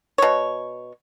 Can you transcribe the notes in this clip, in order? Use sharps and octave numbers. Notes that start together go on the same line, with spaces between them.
B2 C#5